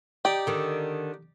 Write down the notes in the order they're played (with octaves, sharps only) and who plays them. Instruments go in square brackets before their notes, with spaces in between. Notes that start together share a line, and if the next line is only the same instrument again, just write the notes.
[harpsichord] D#4 G4 D5 [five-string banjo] G5
[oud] D3 D#3